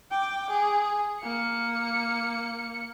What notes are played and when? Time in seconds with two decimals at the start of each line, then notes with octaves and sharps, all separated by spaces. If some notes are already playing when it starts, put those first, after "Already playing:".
0.11 G5 D6
0.50 G#4
1.22 A#3 C#7